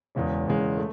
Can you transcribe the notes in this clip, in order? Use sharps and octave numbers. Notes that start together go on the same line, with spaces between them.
E1 E2 C#3 G#3 C#4
E1 E2 C#3 G#3 C#4
A3